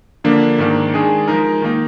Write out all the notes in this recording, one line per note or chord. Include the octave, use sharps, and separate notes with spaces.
D3 F3 A#3 D4
G#2 D#3 A#3 D4
D#3 G#3 D4 G#4
F3 G#3 D#4 A#4
D#3 A#3 D#4